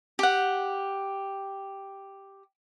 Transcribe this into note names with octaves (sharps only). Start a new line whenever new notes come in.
G4 F#5